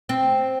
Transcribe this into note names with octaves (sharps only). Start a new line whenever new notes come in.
C4